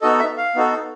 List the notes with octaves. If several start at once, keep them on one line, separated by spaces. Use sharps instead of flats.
B3 D#4 F#4 A4 D#5
E5
F5
B3 D#4 F#4 A4